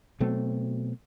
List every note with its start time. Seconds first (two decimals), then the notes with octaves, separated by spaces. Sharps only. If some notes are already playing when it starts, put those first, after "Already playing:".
0.20 B2 F#3 A3 C4